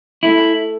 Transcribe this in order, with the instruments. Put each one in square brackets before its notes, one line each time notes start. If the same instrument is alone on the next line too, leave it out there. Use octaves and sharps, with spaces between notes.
[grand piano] A3 [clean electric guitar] E4